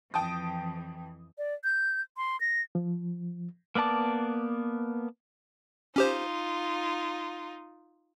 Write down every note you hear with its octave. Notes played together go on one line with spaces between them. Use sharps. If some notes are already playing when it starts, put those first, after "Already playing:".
F2 E3 G5 A5 D#6
D5
G6
C6
A#6
F3
A#3 B3 D5 A5 D6
C#4 D#4 F4 G4 C5